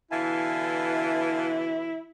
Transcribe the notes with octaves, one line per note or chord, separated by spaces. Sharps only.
B2 D3 E3 E4 F5 G#5 A5